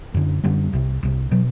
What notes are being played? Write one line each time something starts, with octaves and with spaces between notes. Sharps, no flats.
F#2 D3
F#2 D3 G3
C2 C3
C2 C3
B2 F#3